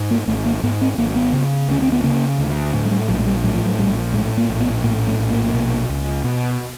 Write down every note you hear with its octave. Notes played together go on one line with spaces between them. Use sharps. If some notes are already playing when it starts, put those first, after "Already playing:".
Already playing: G#2
A#3
G#1 A3
A#3
G#2 B3
C4
G#1 A#3
B3
C#3
D2 C#4
C4
B3
C#3 A#3
D2
A2
G#3
G3
A#1 F#3
G#3
G3
A2 F#3
F3
F#3
A#1 G3
A2 G#3
A#3
A#1
B3
A2 A#3
A3
A#1
A#3
B2
C#2
B2